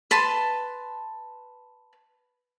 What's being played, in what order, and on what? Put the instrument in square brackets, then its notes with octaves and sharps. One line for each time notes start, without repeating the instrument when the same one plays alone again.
[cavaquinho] B4 A5 C6